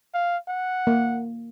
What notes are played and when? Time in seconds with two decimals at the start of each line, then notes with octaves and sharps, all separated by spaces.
0.14 F5
0.48 F#5
0.87 A#3